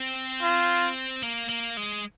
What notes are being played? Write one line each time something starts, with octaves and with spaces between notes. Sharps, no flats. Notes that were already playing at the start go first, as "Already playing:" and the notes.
Already playing: C4
F4
A#3
A#3
G#3